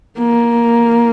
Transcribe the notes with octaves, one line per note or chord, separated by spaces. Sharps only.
A#3